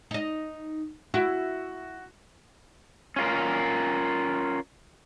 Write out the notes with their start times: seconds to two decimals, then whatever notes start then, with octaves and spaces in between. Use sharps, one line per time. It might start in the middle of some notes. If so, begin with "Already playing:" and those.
0.11 D#4 D#5
1.14 E4 F#4
3.16 C#4 F4 A#4